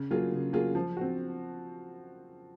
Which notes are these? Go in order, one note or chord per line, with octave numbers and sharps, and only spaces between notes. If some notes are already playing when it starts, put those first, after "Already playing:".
Already playing: C#3
F#3 A#3 F4 G#4
C#3
F#3 A#3 F4 G#4
F3
C4 F#4